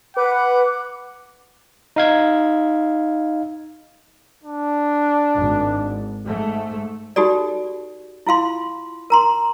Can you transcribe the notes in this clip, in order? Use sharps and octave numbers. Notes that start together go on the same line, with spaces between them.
B4 F#5 D6
D#4 F5 G#6
D4
G#1
G#2 A3
D#4 F#4 G4 A4 D5
E4 F4 F5 C6
A#4 A#5 C6